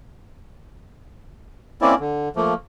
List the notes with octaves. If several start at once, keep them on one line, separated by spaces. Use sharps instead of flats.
A#3 C4 C#4 E4 D5
D3
F3 A3 A#3